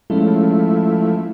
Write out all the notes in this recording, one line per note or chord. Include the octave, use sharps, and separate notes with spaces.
F3 G#3 A3 C#4 E4